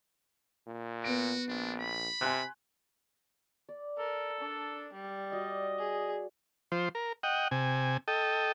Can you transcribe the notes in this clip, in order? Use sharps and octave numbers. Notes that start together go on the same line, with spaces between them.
A#2
B3 F#4 D7
A#1 D4
B5
C3 G#5 C6 F#6
D5
A4 A#4
D4
G3
F#4 D5 D#5
G#4
F3 C5
A#4
D#5 F#5 G5
C3 G#5
A4 D#5 G5